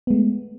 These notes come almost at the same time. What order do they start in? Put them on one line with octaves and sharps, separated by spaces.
B3 G#3 A3